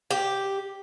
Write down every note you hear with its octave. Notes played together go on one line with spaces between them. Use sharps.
G4